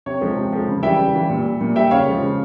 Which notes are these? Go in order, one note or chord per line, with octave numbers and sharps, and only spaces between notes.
C3 C#5
F3 G#3
C3
F3 G#3
C#3
E3 G3 E5 G5
C#3
E3 G3
A#2
G3
A#2
G3 E5 G5
C#3 C#5 F5
F3 G#3
C#3